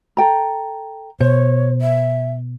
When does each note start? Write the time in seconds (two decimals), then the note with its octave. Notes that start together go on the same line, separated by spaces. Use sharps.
0.17 A4 G5 A#5
1.20 B2 C5 C#5
1.81 E5